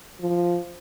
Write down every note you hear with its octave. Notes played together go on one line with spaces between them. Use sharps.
F3